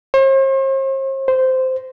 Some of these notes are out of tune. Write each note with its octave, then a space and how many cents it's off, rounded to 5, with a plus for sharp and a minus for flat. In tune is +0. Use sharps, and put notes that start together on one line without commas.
C5 +45
C5 -10